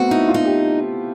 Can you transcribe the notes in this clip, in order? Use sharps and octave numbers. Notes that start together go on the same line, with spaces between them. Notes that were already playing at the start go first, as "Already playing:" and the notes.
Already playing: A3 B3 C4 F#4
D#4 E4
F4
D#4
G4